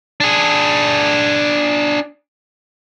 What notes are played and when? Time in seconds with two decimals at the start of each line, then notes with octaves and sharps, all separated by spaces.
0.20 D4 G#4